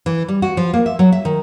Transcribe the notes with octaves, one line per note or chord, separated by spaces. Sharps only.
E3
G3
F#4
F3
A#3
E5
F#3
E5
D#3